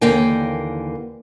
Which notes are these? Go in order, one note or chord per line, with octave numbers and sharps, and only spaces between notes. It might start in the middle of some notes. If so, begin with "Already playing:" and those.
D#2 D3 E3 A#3 G5 G#5